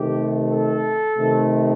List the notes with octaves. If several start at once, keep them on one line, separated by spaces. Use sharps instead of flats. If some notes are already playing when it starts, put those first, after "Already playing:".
Already playing: C3 D#3 A3 G4
A4
C3 D#3 A3